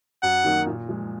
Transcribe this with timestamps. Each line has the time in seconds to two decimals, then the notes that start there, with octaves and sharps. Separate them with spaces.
0.23 F#2 F#5
0.44 D#3 F#3 A#3 D#4
0.67 A#2
0.89 F3 G#3